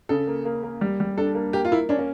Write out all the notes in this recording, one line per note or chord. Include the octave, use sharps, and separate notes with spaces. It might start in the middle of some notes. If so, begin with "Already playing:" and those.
C#3 A4
A#3
A#3
A#3
G3
G3
D4 A4
A#3
A#3 G4
F4
A#3 E4
C#4 D4
A#3